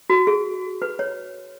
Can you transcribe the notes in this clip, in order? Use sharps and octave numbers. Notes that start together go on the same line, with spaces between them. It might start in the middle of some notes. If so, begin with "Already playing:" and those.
F#4
G#4
B4
C#5